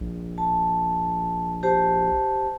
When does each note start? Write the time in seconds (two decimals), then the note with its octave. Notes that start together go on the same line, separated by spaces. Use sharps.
0.01 A#1
0.38 A5
1.63 G4 C5 A5